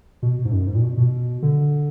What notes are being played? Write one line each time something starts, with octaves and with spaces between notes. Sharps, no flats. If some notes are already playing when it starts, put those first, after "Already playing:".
B2
G#2
F#2
G#2
A#2
B2
B2
D3